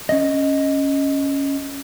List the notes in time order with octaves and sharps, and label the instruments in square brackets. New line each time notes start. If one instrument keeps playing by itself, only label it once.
[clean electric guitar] C#4 D#5